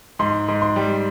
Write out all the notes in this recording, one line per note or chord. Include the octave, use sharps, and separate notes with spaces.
G#2 C6
G#2
C6
G3